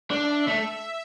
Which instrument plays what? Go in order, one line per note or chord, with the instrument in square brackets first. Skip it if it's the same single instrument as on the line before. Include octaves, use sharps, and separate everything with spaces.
[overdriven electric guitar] D4 [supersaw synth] E5
[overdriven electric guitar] A3